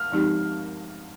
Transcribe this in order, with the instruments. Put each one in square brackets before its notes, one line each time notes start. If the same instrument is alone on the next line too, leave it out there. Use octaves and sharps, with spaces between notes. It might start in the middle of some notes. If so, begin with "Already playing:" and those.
Already playing: [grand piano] F6
[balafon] F3 G#3 C4 D#4 G4